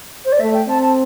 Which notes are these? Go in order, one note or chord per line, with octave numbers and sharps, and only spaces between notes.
C5
D5
A3 E5
G5
C4 A5
A5